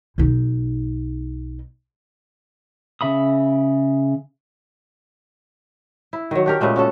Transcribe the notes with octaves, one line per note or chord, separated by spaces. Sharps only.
B1 D#4
C#3 E5 B5 D#6
E4
D#3 F#3
D4 G4 A#4
A#2 C#3 G#3 A3
C#4 F#4 A4